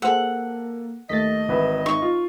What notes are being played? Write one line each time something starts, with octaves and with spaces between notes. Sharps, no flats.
A#3 G#4 A4 C5 F#5 E6
D#2 A3 D#5 A6 B6
G#1 E3 B4 E5
D#4 C#6
F4